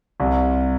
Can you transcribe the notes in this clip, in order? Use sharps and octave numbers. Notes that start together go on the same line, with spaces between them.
C2